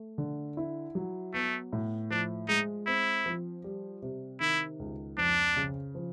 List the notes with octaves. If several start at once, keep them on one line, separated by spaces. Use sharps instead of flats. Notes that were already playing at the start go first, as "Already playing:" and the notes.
Already playing: A3
D3
E4
F#3
A3 B3
A2
F3 D4
G#3 D#4
C4 E4
F3
G3
C3
D#3 E4
C#2
F2 D4
C#3
F3